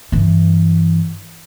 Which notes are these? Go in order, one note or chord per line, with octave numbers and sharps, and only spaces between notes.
G2 E3